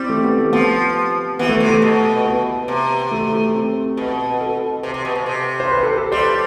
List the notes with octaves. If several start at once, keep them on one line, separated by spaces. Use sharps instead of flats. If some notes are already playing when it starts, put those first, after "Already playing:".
Already playing: G3 C4 E4
A3
B3
A3
F3 B3
E3 B3
A3
C3
A3
B2
B3
C3
A3
A3
C4
B2
A4
C3
C3
B2
C3
C3
C5
B4
A4
A4
G3 C5